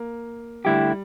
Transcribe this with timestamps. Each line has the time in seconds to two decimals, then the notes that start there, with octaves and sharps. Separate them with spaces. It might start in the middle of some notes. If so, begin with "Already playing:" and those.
Already playing: A#3
0.65 D3 G3 A3 E4 G4